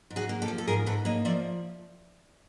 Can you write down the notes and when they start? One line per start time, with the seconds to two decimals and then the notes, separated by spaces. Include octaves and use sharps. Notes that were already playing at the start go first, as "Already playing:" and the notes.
0.10 G#2
0.16 F#4 G#4
0.29 A#3
0.42 G4 A4
0.48 F3
0.58 A4
0.67 G#2 G#4 A#4
0.86 G#2 A4 B4
1.05 A#3 C#5 D#5
1.25 F3 D5 E5